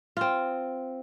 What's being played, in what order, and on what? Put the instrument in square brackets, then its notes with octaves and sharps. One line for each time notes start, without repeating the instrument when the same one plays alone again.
[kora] C4 F4